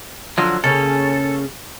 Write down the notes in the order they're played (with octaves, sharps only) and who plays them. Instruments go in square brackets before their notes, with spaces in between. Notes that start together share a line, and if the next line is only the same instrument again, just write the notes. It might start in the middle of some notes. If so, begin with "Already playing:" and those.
[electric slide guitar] D3 F3 F#3 [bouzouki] F5
[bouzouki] C#3 A#3 C#4 [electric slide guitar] A4